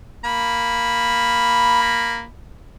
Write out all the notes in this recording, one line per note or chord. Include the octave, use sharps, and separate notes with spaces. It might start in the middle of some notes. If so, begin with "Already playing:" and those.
A#3 B5